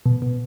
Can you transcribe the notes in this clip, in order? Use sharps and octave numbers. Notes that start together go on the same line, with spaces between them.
B2
B2